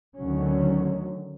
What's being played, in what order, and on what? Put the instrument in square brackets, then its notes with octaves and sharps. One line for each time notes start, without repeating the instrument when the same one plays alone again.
[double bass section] D2 D3 D#3 F#3 C#4